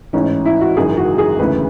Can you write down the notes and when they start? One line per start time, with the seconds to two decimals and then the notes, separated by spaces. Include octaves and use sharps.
0.13 A1 G#2 E3 C#4
0.45 E4
0.61 F#4
0.76 G#1 F#2 C#3 E3 G#4
0.97 F#4
1.18 G#4
1.39 E1 D2 C#3 E3 B4